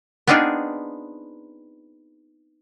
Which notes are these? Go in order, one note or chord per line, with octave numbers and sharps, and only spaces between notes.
B3 C4 D4 D#4 F4 G#4